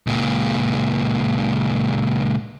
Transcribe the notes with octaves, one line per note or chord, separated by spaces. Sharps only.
C#2 A#2